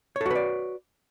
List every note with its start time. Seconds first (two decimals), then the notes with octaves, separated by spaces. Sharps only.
0.16 C#5
0.21 A4
0.26 F#4
0.31 B4
0.35 D5